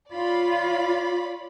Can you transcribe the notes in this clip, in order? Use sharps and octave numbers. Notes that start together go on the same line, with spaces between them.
F4 C#5 D5 B5